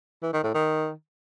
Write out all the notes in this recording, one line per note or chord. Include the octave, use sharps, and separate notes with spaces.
E3
D#3
A2
D#3